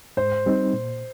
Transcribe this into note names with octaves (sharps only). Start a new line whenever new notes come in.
G#2 C5
G3 C4 D#4
A#2